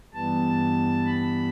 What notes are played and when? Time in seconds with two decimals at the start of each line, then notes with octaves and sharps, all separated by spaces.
0.14 G2 E3 G3 B3 A5
1.06 B5